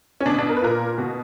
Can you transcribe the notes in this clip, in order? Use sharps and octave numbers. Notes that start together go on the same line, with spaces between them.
C#4
B2 D4
D4
A#4
B4
A#2 A#4
B2 F#4